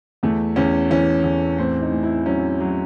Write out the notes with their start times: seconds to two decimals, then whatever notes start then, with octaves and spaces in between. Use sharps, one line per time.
0.23 E2 A3
0.56 E2 C#4
0.90 E3 C#4
1.24 E2
1.58 A2 C4
1.81 D#4
1.92 A2
2.03 E4
2.25 F#3 C#4
2.60 F#3